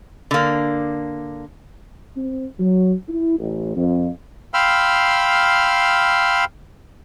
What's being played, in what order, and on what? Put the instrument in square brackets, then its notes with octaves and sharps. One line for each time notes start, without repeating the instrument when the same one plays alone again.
[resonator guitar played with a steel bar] D3 A#3
[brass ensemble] C4
F#3
E4
A1
F2
[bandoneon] F5 G5 B5 C6 E6 F6